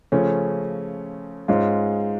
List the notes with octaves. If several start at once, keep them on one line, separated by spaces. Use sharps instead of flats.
C#3 F3 A3 C#4
G#2 G#3 C#4 F4